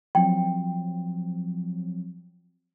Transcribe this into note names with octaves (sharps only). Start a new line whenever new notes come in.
F3 F#3 C4 G5